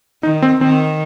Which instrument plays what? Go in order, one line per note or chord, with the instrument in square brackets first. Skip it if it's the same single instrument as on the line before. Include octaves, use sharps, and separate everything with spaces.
[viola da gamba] D#3 [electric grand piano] D#4
[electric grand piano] C4
[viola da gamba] D#3 [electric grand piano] C4